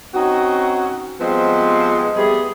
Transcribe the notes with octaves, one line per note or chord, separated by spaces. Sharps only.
C4 C#4 D#4 F#4
F3 G3 G#3 B3 C4
G3 A3 B3 G#4